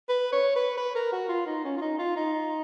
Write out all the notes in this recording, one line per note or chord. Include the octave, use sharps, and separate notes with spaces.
B4
C#5
B4
B4
A#4
F#4
F4
D#4
C#4
F4
D#4
F4
D#4